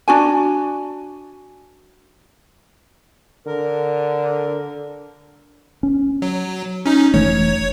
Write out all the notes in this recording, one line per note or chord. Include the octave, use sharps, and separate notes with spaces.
D4 F#4 G#5
D3 A#4
C#4
F#3
C#4 D#4
F1 E3 A3 C#5